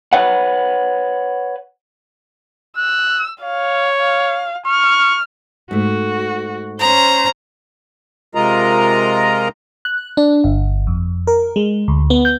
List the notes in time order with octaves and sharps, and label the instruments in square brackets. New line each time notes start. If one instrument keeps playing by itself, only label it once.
[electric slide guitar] B4 C#5 F#5
[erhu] E6 [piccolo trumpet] F#6
[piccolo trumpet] C#5 [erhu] F5
[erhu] F5
[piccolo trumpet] C#6 [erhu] F6
[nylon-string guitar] G#2 A3 [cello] F#4
[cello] C#4 C5 [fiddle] A#5
[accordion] C3 G#3 F4 A#4 D#5 A#5
[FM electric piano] F#6
D4
G1
F2
A#4
G#3
D2
B3
G6